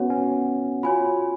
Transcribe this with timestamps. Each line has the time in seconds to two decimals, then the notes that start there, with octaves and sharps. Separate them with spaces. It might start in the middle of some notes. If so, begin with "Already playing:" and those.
Already playing: B3 C#4 F#4 C#5 F#5
0.10 C#4
0.83 F4 F#4 C#5 G#5 B5